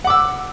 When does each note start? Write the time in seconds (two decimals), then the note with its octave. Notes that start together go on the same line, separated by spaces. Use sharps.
0.04 F#5
0.07 D6
0.10 E6